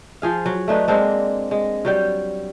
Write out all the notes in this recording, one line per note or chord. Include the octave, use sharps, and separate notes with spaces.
F3 G#4 F5
F#3
A3 D4 D#4 B4
G#3 A#3 C4 D4
G#3
F#3 G3 G5